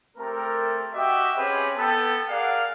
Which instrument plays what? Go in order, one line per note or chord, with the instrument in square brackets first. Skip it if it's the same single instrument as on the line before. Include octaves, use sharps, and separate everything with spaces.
[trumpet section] A3 C4 G4 A4 A#4
F#4 G4 D#5 E5 F#5 G5
C4 C#4 G4 G#4 B4 C#5
B3 A4 G5
G#4 A#4 D5 F5 F#5